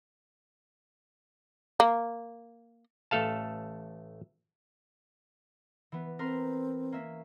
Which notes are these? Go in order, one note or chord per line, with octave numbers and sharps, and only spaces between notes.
A#3
A1 A3 A4 F5 A5
E3 B3
C4 A#4 B4 C6
A#3 C#4 E5